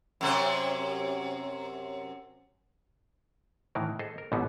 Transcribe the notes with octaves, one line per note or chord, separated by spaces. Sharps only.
F#2 C3 C#4
A2 D#3 E3 A#4
G#4 A4 C5 D#5
A#4
A1 G#2 B2 D3 B3 D#4